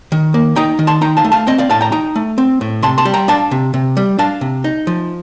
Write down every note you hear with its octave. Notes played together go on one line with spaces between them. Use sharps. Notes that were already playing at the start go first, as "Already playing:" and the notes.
D#3
A#3
D#4 G5 A#5
D#3
A5 C6
D#4 G5 A#5
F5 A5
A3
F5 A5
C4 D#5 G5
D5 F5
A2 F5 A5
G5 A#5
D#4 G5 A#5
A3
C4
A2
C3 A5 C6
A5 C6
G3
G5 A#5
D4 F5 A5
C3
C3
G3
D4 F5 A5
C3
D#4
F3